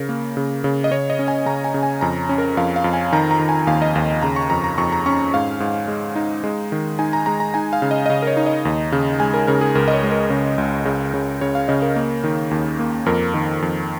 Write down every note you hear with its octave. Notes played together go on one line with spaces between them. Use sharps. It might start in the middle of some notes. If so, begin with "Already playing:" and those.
Already playing: C#3 A#4
A#3
C#3
C#3
D#5
C#3 C#5
D#5
C#4
G#5
C#3 A#5
G#5
C#3
G#5
F2 A#5
C#4
A#4
F2 F5
F5
F2
G#5
D#3 A#5
A#5
D#3
G#5
D#2 F5
D#5
D#2 F5
C#3 A#5
C#6
F2 A#5
A#5
F2 C#6
A#5
C#4 C#6
G#2 F5
G#2
G#3
D#4
G#3
D#3
D#4 G#5
A#5
G#3 A#5
A#5
D#4 G#5
F5
C#3
D#5
D#5
C#3 F5
A#4
C#5
D#4
D#5
D#2
C#3
G#3 G#5
A#4
C#3 A#4
G#4
C#2 A#4
D#5
C#5
G#3
A#4
C#3
C#2
C#3
C#3
C#3 C#5
F5
C#3 D#5
A#4
A#3
D#3
D#2
A#3
F2 A#4
D#3
F2